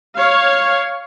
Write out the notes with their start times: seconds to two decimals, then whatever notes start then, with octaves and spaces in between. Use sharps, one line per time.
0.16 C#5 F5